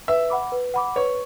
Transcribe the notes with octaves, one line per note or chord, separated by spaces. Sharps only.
B4 E5
F#5 B5 D6
B4
F#5 B5 D6
B4 C#5